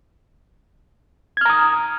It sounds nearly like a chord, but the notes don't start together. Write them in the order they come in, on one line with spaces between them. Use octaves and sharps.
G#6 F6 A#5 D#6